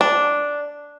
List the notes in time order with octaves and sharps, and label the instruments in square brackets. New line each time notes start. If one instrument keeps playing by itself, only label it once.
[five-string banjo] D4